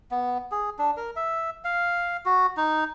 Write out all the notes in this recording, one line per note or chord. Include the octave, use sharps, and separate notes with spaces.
B3
G#4
D4
A#4
E5
F5
F#4
D#4